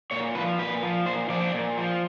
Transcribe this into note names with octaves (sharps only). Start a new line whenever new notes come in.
A#2 C#5
F3 B4
A#2 B4
F3
A#2 C5
F3 D5
A#2
F3